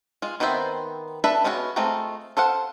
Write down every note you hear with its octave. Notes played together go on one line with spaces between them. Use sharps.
G#3 F4
D#3 B3 C4 C5 E5
D4 A4 B4 E5 B5
G#3 B3 C#4 F4 F#4
G#3 A3 C4 F4 A#5
A4 C5 F5 F#5